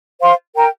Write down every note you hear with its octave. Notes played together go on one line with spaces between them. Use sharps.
C5 F5 C6
A#4 G5 A#5